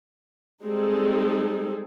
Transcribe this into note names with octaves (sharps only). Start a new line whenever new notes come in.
G3 G#3 C4 D#4 G#4 A4